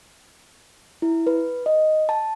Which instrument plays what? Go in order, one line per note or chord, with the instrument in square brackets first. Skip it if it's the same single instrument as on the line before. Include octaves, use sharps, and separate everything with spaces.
[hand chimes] E4
B4
D#5
A5